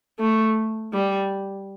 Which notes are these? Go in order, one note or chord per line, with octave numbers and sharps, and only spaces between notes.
A3
G3